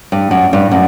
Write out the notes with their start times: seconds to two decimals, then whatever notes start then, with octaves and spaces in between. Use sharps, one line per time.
0.12 G2
0.31 F#2
0.53 G2
0.71 F#2